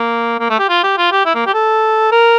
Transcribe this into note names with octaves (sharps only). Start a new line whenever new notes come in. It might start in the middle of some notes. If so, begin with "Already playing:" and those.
Already playing: A#3
A#3
A3
G4
F4
G4
F4
G4
E4
A#3
G4
A4
A#4